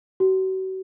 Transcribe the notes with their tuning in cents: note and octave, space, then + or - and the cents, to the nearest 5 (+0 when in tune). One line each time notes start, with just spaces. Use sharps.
F#4 +40